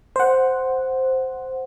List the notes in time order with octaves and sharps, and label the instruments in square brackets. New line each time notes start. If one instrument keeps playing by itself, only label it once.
[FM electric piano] C5 F#5